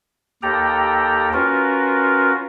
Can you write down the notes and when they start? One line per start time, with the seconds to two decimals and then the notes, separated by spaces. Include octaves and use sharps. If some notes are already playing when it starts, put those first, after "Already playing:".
0.43 D#2 G4 A4 G5 A#5
1.33 C#4 F4 F#4 A#4 B4